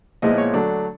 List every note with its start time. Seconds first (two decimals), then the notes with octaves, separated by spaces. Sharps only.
0.22 A#2 F3 G#3 B3 E4 D#5
0.38 C#5
0.53 D3 F#3 A3 D4